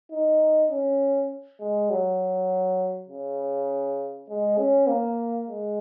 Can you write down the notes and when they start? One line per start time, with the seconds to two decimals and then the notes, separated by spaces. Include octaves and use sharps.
0.11 D#4
0.71 C#4
1.60 G#3
1.90 F#3
3.09 C#3
4.29 G#3
4.58 C#4
4.88 A#3
5.48 G#3